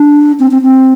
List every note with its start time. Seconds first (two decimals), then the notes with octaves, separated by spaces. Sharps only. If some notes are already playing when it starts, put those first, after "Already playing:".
Already playing: D4
0.39 C4
0.51 C4
0.62 C4